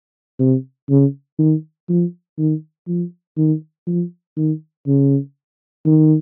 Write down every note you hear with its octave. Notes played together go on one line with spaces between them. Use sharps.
C3
C#3
D#3
F3
D#3
F3
D#3
F3
D#3
C#3
D#3